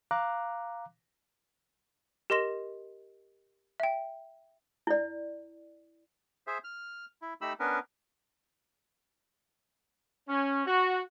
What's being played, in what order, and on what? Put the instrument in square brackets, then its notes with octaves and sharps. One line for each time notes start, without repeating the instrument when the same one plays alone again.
[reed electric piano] F5 A#5 D6 F#6
[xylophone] G4 A#4 D#5 C6 A#6 E7
E5 G5
[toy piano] E4 D5
[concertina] G#4 C5 E5
F6
E4
A3 D#4 G4 B5 E6
B3 C#4 D4 A#4 B4
[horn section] C#4
F#4